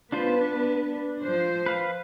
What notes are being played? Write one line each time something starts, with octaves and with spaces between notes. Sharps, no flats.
B3 D4 F4 B4 C5
D4
F3 C5
B4 F5